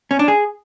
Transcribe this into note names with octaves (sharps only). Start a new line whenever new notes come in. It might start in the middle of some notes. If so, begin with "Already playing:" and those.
C#4
D4
G#4